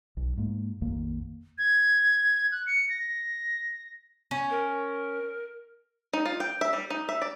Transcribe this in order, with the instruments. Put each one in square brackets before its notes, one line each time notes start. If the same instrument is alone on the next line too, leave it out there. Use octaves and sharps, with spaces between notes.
[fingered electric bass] B1
G#2 G#3 A#3
A#1 F2 D#3 A#3
[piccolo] G#6
F#6
C#7
A#6
[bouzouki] C#4
[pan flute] A#4
[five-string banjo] D#4
F4
G5
E5
G3
D#4
E5
D5